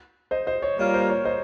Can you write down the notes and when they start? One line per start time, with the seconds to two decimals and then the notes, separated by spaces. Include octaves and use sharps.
0.31 C5 D#5
0.47 C5 D#5
0.62 C#5
0.78 G3 A#3 F4 A#4 C#5
0.94 C5
1.10 C#5
1.25 C5 D#5